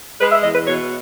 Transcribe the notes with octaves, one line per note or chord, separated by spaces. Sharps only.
G#3 B4
E5
E2 D#5
B4
B2 C#5